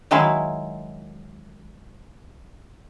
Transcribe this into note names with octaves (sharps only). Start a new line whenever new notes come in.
D#3 F#3 G#3 E4 F5